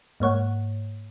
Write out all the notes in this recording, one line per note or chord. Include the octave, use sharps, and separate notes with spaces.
G#2 A#3 C#5 F#5